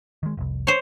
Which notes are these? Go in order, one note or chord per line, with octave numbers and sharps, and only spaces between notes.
D#3 G#3
F1 C2
C5 C#5